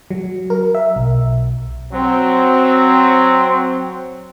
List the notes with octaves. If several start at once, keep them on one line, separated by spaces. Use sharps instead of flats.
F#3
A#4
E5
B1
F#3 C4